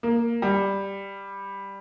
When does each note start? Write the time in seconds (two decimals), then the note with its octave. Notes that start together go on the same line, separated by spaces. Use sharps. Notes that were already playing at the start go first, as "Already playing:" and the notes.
0.03 A#3
0.42 G3